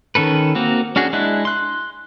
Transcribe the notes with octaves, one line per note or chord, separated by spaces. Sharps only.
D#3 C#4 A4 B4
A#3 C4 F#4
C#4 D4 F#4 G#4
G#3 D4 E4 F#6
C6 F#6